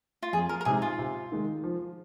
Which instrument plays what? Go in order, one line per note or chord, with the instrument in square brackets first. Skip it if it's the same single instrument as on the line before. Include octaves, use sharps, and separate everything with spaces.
[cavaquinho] F4
[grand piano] F2 [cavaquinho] G#4
[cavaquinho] A#4
A#4
[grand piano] C3 G#3 D#4 [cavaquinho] G#4
[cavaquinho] F4
[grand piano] C3
D#3 G#3
F3